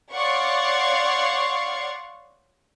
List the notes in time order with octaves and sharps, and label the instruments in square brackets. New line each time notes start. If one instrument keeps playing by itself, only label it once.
[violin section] C#5 D5 F5 F#5 C6 C#6